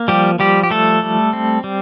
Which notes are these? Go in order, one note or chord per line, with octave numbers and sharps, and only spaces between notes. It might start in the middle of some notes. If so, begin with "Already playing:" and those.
Already playing: A#3
F3 G3 G4
F3 G3 G4
G4
G3 A3 A4
G3
C4
G3